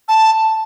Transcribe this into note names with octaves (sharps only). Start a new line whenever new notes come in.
A5